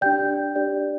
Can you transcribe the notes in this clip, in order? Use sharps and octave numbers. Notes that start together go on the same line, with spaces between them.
D4 G4 D5 G5 G6
D4 G4 D5